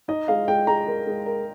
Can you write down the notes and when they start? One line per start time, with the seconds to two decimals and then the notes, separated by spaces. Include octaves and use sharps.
0.08 D#4 D#5
0.28 G#3 F5
0.48 G#3 G5
0.67 G#3 A#5
0.87 A#4
1.07 G#3
1.26 A#4